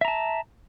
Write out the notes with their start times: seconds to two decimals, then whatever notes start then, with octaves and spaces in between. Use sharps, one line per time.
0.01 E5
0.05 A#5
0.08 A5